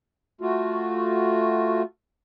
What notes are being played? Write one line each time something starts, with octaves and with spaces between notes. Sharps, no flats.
A3 F4 F#4